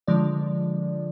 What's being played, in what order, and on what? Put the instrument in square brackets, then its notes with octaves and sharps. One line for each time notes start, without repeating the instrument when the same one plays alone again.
[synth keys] D3 F3 G#3 D5